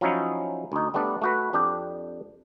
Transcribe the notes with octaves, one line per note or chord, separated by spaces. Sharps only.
F3 F#3 C#4 D#4 E4
D2 D#4
G3 A3 B3 D4
A3 F#4 B4
F2 D4 G4 G5